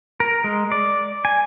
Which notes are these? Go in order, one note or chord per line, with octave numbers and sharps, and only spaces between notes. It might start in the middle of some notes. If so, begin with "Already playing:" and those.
A#4
G#3
D5
G#5